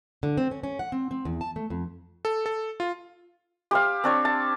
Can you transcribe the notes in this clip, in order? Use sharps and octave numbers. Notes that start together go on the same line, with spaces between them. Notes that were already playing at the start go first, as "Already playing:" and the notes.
D3
C4
C#4
C#4
F#5
C4
C4
E2
A5
A3
F2
A4
A4
F4
G4 C5 F5
C4 D4 C#5
A5